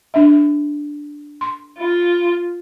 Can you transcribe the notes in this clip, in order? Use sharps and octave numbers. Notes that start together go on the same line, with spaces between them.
D4 E5
C6
F4